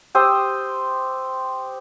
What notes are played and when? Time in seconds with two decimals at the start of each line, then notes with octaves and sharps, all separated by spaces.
0.15 G4 C5 D#6 E6